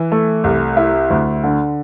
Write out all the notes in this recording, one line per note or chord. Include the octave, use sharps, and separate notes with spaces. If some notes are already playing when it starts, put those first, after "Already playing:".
Already playing: E3
A3
C2
E4
D2
D3